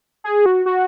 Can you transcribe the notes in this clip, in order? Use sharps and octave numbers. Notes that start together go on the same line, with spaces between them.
G#4
F#4
F#4